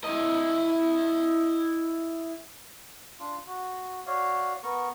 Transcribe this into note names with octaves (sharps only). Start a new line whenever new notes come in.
E4 D#5
D4 F4
F#4
F#4 C#5 D5 F5
B3 A#4 C#6